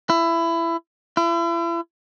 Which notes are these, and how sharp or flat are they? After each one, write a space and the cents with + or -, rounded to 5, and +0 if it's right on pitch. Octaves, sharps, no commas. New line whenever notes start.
E4 +20
E4 +40